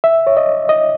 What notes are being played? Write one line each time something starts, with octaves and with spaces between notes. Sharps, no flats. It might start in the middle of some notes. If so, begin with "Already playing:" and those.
E5
C#5
D#5
D#5